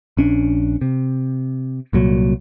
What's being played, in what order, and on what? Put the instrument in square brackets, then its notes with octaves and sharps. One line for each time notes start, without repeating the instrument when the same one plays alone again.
[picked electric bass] A#1 C#4 D4
C3
C2 A#2 F#3